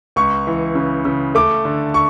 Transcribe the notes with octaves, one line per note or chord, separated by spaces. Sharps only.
C#2 C#6
E3
C#3
C#3
A3 D6
D3
C#6